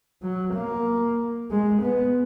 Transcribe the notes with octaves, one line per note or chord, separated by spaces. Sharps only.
F#3
A#3
G#3
B3